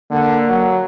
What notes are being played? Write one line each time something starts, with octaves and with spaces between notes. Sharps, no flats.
D3 A#3
F#3